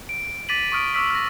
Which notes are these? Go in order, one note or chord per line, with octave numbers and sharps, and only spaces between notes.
D7
D6 A6 B6 D#7 F#7
C#6 D#6 F6 D7
C#6 D6 E6 F6 B6
F6 A#6